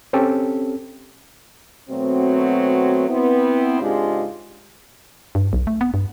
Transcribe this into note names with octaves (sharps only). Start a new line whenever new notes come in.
C4 C#4 G4 A4
B2 F#3 A3 C4
B3 C4 E4
G#2 C#3 G#3 D4 F4 G4
G2
B1
A3
B3
G2